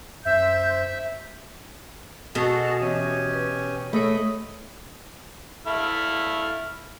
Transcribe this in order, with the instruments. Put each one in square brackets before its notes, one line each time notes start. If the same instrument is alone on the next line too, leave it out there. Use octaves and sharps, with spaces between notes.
[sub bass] F#2 [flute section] C5 G6 [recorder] E5
[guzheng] B2 [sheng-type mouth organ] F#4 G#4 A4
[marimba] E3 [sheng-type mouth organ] C#4 G4 G#5
[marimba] B4
[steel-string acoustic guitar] A3 [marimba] G#4 A4 C#5 [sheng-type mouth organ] D#5 B5
[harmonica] A3 E4 F5